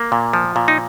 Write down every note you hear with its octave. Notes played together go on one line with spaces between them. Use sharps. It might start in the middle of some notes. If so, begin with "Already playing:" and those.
Already playing: A#3
A#2
F3
A#2
D#4